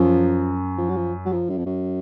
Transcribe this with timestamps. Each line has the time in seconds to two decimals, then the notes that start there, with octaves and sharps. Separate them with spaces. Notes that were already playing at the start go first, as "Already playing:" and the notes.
Already playing: F#2 F3
0.78 F3
0.89 F#3
0.96 F3
1.26 F#3
1.32 F3
1.50 F#2
1.58 F2
1.66 F#2